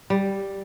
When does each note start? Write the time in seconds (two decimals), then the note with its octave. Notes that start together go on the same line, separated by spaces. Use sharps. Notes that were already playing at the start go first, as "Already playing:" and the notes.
0.10 G3